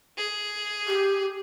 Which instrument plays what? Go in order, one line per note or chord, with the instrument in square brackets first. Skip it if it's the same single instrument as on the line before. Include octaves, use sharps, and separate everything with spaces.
[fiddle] G#4
[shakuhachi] G4